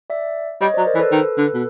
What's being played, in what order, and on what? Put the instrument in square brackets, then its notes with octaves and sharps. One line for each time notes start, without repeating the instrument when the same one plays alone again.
[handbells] D5 E5
[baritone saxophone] G3 [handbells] C#5 D#5
[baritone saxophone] F#3 [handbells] C5 D5
[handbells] A#4 C5
[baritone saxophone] E3
[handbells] A4 B4
[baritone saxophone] D#3
D3
B2